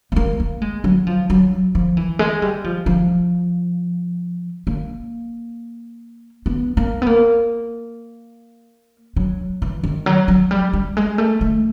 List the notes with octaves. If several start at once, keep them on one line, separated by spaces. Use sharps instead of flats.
B3
A#3
A#3
G#3
F#3
F3
F#3
F3
E3
G#3
G3
F3
F3
A#3
B3
A#3
B3
A#3
F#3
E3
D#3
F#3
F#3
G3
G3
G#3
A3
A3